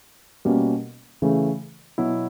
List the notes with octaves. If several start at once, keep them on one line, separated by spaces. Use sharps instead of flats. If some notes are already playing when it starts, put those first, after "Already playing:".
B2 G3 A#3 C#4
C#3 E3 A3
B2 F#3 B3 E4